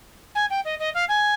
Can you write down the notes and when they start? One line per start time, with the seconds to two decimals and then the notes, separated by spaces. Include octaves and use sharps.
0.35 G#5
0.50 G5
0.64 D#5
0.79 D#5
0.94 F5
1.08 G#5